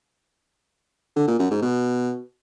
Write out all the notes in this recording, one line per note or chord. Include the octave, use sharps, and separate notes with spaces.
D3
A#2
F#2
G#2
B2